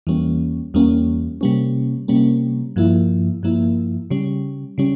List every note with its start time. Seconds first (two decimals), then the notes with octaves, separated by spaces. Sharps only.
0.07 E2 E3 G3 A#3 C#4
0.74 E2 E3 G3 A#3 C#4
1.41 C3 G3 A#3 C#4
2.08 C3 G3 A#3 C#4
2.76 G2 F3 A#3 E4
3.43 G2 F3 A#3 E4
4.11 C#3 G3 C#4
4.78 C#3 G3 C#4